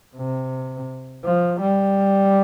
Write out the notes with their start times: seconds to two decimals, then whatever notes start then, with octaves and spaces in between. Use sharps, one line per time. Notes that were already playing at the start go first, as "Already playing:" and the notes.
0.16 C3
1.25 F3
1.61 G3